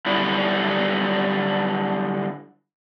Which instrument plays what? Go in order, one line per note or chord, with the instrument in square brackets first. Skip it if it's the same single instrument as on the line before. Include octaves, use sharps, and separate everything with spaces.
[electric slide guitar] D3 F#3 G3 E4